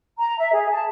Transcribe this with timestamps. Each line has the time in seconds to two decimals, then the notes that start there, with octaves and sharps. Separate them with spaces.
0.18 A#5
0.38 E5
0.52 G#4
0.71 A5